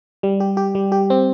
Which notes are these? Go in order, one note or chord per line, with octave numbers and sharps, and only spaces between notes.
G3
G4
G4
G3
G4
C4